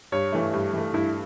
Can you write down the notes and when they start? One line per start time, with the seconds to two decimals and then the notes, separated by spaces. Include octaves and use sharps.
0.12 G2 C#5
0.32 E3 A3
0.53 G2
0.73 E3 A3
0.94 G2 E4